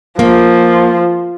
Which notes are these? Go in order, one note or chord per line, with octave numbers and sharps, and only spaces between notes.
F3 A#3